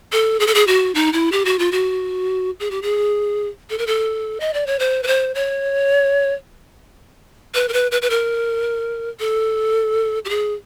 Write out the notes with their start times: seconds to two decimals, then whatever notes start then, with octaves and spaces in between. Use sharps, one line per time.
0.12 A4
0.40 G#4
0.47 A4
0.54 G#4
0.67 F#4
0.95 D#4
1.13 E4
1.32 G4
1.45 F#4
1.59 F4
1.72 F#4
2.60 G#4
2.71 G4
2.82 G#4
3.70 A4
3.78 A#4
3.87 A4
4.40 D#5
4.53 D5
4.67 C#5
4.79 C5
5.03 B4
5.07 C5
5.35 C#5
7.55 B4
7.68 A#4
7.73 B4
7.91 B4
8.02 B4
8.10 A#4
9.20 A4
10.25 G4
10.29 G#4